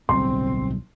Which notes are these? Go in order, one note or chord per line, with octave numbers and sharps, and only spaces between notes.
D1 B1 G3 C4 C6